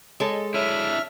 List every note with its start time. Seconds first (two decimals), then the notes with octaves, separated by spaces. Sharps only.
0.20 G#3 A4 C#5
0.54 D4 E4 C#5 E5 F6 D#7